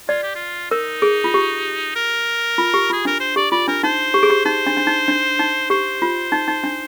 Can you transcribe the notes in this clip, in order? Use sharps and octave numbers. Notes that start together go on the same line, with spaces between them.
F4 D5
G4
F4
D#4 A#4
G#4
F4
G4
A#4
F4
G4
F4 G#4
D4 A#4
C5
G4 D5
F4 D5
D4 A#4
D#4 C5
G4
G#4
G4
D#4 C5
D4
D4
D#4
D4
D#4
G4 C5
F4
D#4
D#4
D4